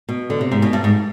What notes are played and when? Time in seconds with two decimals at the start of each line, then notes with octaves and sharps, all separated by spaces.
0.09 B2
0.30 D3
0.41 C3
0.52 G#2
0.62 B2
0.73 G2
0.84 G#2